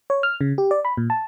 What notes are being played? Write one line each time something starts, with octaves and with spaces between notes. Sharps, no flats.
C#5
F6
C#3
G4
D5
B5
A#2
A5